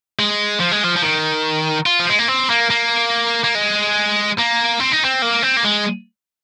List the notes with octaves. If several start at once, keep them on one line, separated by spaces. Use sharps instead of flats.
G#3
F3
G#3
F3
F3
D#3
F4
F3
G#3
A#3
C4
A#3
A#3
A#3
G#3
A#3
C4
D#4
C4
A#3
C4
A#3
G#3